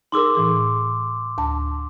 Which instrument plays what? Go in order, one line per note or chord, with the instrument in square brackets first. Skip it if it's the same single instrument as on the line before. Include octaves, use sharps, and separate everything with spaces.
[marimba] D#4 G#4 A#4 [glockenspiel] C6 D6 E6
[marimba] A2 E3 G#4
D2 A5